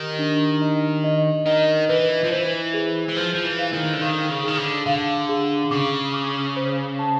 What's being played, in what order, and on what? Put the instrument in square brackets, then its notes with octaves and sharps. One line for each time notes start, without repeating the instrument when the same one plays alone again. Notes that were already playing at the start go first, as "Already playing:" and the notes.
Already playing: [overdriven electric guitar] D#3 [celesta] G4 D#5
[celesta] D4
D#5
D#5
[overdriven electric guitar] D#3 [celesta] D#5
[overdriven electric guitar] E3 [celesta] B4
[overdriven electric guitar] F3
[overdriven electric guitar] E3 [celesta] C5
[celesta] G#4
[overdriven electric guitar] E3
[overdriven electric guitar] F3 [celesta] C5
[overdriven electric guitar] F3
E3
[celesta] F5
[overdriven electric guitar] D#3
D3
[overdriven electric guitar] D#3 [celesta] F5
[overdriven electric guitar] C#3
[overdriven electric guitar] D#3 [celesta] G#4
[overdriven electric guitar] D3
[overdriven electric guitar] D3 [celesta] F5
[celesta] G#4
[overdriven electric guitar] C#3 [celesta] D6
[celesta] D6
C5
A5